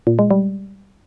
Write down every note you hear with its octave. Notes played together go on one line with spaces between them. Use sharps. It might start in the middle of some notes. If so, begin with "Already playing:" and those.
A#2
G#3
G3